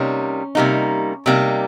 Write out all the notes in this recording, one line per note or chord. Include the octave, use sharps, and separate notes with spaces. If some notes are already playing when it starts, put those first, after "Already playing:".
Already playing: C3 G3 A#3 C#4 D#4
C3 G3 A#3 D#4
C3 G3 A#3 D#4